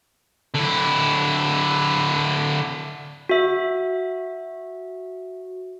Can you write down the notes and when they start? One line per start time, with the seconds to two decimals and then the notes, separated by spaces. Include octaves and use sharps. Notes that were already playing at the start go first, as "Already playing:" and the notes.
0.55 D3 E4
3.29 F#4 E5